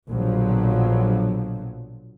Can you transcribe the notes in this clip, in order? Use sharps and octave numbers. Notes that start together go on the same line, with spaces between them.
A#1 B2 D3 F3 F#3